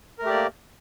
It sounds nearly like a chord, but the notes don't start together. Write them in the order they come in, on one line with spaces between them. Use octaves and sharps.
A#4 A3 G4 D5 A#3